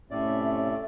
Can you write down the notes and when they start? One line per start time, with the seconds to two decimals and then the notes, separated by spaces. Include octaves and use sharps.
0.11 A2 C3 A3 C#4 D5 E5